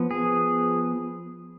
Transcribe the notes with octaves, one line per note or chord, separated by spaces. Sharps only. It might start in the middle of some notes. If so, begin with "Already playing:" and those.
Already playing: F3 B3
G#4